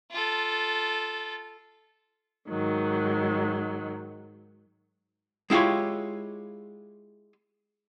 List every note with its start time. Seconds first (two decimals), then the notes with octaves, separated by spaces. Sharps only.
0.11 F4 A4
2.49 G#2 D#3 F#3
5.50 G#3 E4 F4 G4 C#5